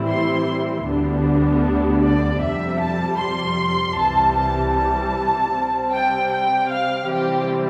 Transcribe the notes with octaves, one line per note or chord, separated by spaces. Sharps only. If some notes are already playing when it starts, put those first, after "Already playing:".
Already playing: A2 E3 G3 C4 E4
C6
D2 D3 G3 B3 D4
D5
F2 C3 G3 E5
A5
C6
C2 C3 E3 G3 A5
A5
A5
C3 G3 C4
G5
G5
F5
C3 E3 G3 C4 G4